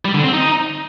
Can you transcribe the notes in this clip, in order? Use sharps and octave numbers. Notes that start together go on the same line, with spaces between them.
G3
D3
C4
D#4